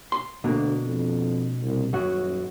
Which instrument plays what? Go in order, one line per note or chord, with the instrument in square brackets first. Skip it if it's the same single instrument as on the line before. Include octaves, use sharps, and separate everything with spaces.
[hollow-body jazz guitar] C6
[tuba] D2 [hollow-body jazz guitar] B2 A#3 D4
[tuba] F2
C2
[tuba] D#1 [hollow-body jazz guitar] F#2 F#3 F#4